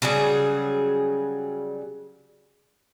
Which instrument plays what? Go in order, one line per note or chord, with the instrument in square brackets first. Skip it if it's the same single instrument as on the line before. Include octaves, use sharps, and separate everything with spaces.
[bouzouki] C#3 F#3 G3 G#4